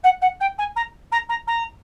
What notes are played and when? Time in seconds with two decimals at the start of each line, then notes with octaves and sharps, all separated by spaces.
0.03 F#5
0.21 F#5
0.40 G5
0.58 G#5
0.76 A#5
1.11 A#5
1.29 A#5
1.47 A#5